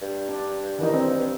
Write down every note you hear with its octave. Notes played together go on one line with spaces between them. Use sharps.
G2
D4
D#3 E3 D#4
C4
G2